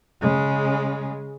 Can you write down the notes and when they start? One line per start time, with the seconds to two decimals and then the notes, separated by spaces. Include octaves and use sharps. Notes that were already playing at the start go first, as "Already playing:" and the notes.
0.21 C#3 G#3